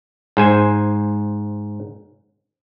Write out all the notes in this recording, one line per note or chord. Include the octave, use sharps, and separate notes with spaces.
G#2 C5 G#5